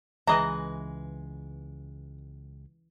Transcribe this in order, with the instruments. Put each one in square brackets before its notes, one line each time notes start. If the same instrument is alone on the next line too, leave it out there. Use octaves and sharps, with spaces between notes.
[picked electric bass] C#2 G#3 [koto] E3 [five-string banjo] B4 D#5 A#5